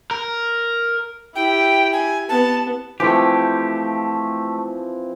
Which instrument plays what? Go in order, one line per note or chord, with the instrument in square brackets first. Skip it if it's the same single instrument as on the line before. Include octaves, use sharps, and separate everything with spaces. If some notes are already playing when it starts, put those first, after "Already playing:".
[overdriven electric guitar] A#4
[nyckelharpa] E4 G4 [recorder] G5
[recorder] G#5
[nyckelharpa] B3 [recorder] A5
[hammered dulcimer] E3 F3 C4 [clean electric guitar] A3 G4